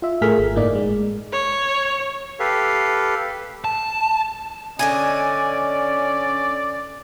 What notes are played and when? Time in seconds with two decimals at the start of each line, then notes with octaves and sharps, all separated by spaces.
0.02 F4 E5
0.22 A2 A3 G#4 A#4 F6 B6
0.38 G#1
0.55 G1 A2 A#3 D#4 D5
0.75 G#3
1.32 C#5
2.40 G4 A4 B4 F5
3.64 A5
4.79 D3 C#4 D5 D#5 G#5